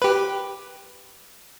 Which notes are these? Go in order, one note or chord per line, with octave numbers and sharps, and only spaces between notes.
G4 B4